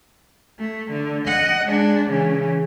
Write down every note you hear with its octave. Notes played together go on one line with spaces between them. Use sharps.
A3
D3
D#5 F#5
G#3 D4
C#3 E3